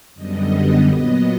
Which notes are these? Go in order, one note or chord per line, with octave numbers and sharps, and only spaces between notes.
F#2 D3 G3 B3 D#5
A#2 F#3 B3 D#5